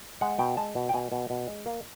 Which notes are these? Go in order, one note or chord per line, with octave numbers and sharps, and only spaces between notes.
G#3 F#5
B2 G5
G#3 A5
B2
G5
B2 G#5
B2
B2
G#3
A#3